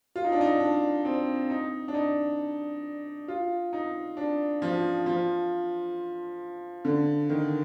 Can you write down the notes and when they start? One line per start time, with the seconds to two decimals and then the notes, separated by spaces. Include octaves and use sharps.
0.16 F4
0.24 D#4
0.32 D4
0.41 D#4
0.60 D4
1.05 C4
1.50 D#4
1.88 D4
1.94 D#4
3.28 F4
3.73 D#4
4.17 D4
4.62 F3
5.06 F3
6.85 D3
7.29 D#3